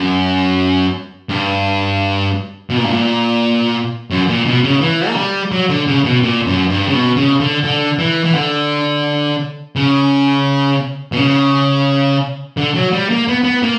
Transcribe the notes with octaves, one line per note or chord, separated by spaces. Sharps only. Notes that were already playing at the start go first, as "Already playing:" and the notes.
Already playing: F#2
G2
B2
A#2
G2
A#2
F#2
A#2
B2
C#3
E3
A#3
G3
F#3
D3
C#3
B2
A#2
F#2
G2
C#3
B2
C#3
D3
D3
E3
E3
D3
C#3
B2
C#3
D3
F#3
G3
A#3
B3
B3
A#3